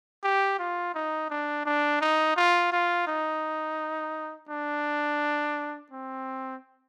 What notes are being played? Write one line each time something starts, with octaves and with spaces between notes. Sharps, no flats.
G4
F4
D#4
D4
D4
D#4
F4
F4
D#4
D4
C4